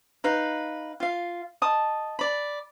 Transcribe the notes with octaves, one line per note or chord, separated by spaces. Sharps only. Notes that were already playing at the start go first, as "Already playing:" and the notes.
D#4 B4 F5
F4 F5
D#5 A5 D#6
D5 B5